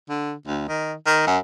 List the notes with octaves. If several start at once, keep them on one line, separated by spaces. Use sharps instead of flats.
D3
D2
D#3
D#3
F#2